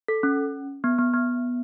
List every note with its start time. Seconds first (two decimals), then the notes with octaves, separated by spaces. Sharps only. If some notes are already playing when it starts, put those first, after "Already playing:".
0.08 A4
0.23 C#4
0.84 B3
0.99 B3
1.14 B3